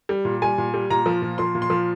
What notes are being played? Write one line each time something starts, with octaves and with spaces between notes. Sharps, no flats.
G3
A#2
G3 G#5
A#2
G3
A#2 A#5
F3
A#2
F3 C6
A#2
C6
F3